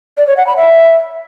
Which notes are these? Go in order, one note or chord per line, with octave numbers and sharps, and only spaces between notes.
D5
C#5
F#5
B5
E5